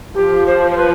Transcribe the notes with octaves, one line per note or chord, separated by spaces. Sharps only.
F3 G4
C5
C5
B4